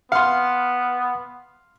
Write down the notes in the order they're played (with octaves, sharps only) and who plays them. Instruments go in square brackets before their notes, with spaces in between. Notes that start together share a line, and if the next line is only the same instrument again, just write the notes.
[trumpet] B3 [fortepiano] F5 C6 [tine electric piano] F#5 F6